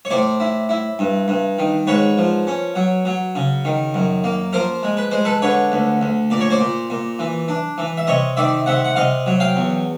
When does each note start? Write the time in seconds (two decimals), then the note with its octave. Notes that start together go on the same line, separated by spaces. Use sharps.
0.05 C#5
0.10 A2 C5 D5
0.40 E4
0.69 E4
0.99 G2
1.28 G2
1.59 D#3
1.87 G#2 B4 C#5
2.18 F3
2.47 C#4
2.76 F#3
3.05 F#3
3.35 C#3
3.65 D#3
3.94 F#2
4.24 A#3
4.53 F3 A#4 C5
4.83 G#3
4.97 B4
5.11 G#3 C5
5.25 A4 B4
5.42 D3 B4 C#5
5.72 D2
6.01 D2
6.30 A#2 D5
6.40 C#5
6.51 C5 D5
6.60 A#2
6.90 A#2
7.19 E3
7.48 D4
7.78 E3
7.97 E5
8.07 C3 C#5 D#5
8.37 D#3 D5 E5
8.66 C3 E5 F#5
8.85 F#5
8.96 C3 D#5 F5
9.26 F#3
9.40 F5 G5
9.56 E2